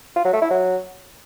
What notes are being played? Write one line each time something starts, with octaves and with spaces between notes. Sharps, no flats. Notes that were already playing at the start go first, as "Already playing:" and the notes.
F4
F#3
A3
E4
F#3